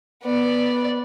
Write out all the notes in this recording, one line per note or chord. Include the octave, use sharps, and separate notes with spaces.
B3 D5